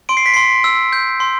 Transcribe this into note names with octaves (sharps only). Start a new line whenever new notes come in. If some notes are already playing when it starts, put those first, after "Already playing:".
C6 D7
C7
B6
C6 C7
E6
G6
C6